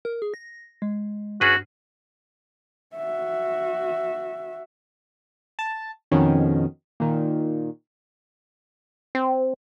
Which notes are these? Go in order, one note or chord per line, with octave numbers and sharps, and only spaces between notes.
A#4
G#4
A#6
G#3
G2 C#4 F#4 G#4 B4
F#4 E5
A5
F2 B2 D#3 C#4
A#2 D#3
C4